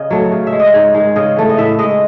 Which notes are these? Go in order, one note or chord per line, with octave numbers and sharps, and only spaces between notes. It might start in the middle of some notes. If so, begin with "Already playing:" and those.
Already playing: C#3 D#5
F#3 A3
C#3
E5
G#3
D#5
G#2 C#5
D#3 G#3
C#3 D#5
E3 A3
D#5
A2 E5
G#3 D#5